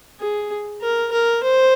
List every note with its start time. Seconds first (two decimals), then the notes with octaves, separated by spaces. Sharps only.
0.20 G#4
0.81 A#4
1.12 A#4
1.43 C5